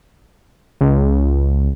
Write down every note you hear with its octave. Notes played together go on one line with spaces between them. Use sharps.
C#2